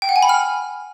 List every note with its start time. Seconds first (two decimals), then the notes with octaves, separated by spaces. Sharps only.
0.02 G5
0.09 F#5
0.16 G#5
0.23 B5
0.29 F6